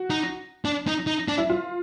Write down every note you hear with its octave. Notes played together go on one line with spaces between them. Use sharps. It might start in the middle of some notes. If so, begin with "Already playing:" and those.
Already playing: F#4
D#4
D4
D#4
D#4
D4
E4
F4